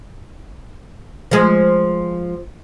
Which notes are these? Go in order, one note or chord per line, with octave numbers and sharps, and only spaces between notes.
F3 G#3